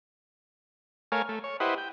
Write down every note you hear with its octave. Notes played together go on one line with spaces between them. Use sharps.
A3 A#4 C#5 F5 G#5
A3
C#5
E4 G4 B4 C5 D#5 F#5
G5